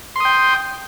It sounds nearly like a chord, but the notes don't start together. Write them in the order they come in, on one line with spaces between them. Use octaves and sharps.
C6 D#6 G5